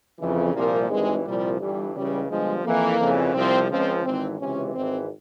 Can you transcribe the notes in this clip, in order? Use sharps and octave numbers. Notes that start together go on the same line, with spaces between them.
F2 C#3 E3
C2 A#2 F3 A#3
G#1 G2 E3 G#3
C2 A#2 F3 G3
G1 G2 E3 G3
C#2 C#3 E3 G3
G1 G2 F3 G#3
F2 E3 A#3
F2 C#3 E3
C2 C3 F3 C4
C#2 C#3 F3 C4
G#1 G#2 E3 C4
C#2 C3 E3 C#4
G#1 G#2 E3 C4